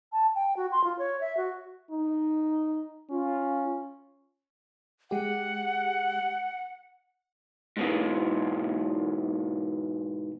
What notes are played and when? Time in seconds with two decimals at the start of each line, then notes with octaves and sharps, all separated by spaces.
0.13 A5
0.35 G5
0.57 F#4
0.72 C6
0.84 F4
0.99 C#5
1.21 E5
1.37 F#4
1.91 D#4
3.10 C#4 F4
5.11 G#3 G4 F#5
7.77 G#2 B2 E3